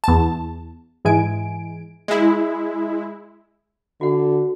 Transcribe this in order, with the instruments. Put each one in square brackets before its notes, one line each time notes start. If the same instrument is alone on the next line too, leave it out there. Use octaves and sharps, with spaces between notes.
[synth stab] E2 A5
G#2 E3 G#3 E4 G#5 D7
[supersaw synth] G#3 E4
[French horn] D3 [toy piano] F#4 F#5